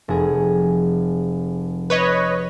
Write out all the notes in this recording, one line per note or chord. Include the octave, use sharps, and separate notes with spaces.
F1 G#4
B4 C#5 D#5